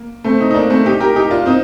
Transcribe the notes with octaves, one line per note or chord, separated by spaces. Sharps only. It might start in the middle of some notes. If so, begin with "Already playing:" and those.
Already playing: A#3
A3 C4
C4 D#4
D#4
A#3 D4
A3 C4
D#4 G4
G4 A#4
D#4 G4
D4 F4
C4 D#4